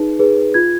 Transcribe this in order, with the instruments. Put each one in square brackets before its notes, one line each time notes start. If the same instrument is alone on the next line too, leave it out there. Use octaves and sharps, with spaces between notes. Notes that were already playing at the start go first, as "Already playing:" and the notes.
Already playing: [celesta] D#4 G#4 B4
G#4 B4
F4 G#6